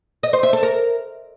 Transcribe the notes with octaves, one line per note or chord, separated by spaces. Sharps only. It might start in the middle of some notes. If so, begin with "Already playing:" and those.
D#5
C5
E5
A4
A#4